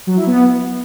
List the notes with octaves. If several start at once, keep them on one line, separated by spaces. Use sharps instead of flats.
F#3
E4
B3